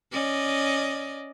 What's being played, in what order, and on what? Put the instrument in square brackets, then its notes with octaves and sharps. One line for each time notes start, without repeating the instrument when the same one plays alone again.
[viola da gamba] C#4 D5 D#5